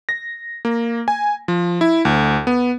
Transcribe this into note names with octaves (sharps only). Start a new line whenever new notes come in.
A#6
A#3
G#5
F3
E4
D2
B3